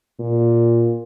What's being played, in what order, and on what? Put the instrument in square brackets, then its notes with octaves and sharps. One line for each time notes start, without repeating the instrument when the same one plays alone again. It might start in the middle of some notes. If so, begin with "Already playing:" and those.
[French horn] A#2